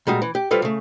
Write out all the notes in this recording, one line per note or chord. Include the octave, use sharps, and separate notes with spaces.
A#2 G3 G#3 F#4
E3
G4
F3 G3 F4 A4 B4
C#3 A3